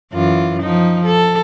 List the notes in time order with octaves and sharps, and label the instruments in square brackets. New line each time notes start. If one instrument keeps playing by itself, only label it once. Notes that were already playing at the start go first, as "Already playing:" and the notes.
[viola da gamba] F#2 E3 F4
F3 D#4
A4